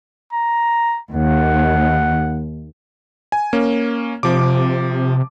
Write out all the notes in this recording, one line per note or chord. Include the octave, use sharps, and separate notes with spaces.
A#5
D#2 F#5
G#5
A#3 C#4
C3 F3 D6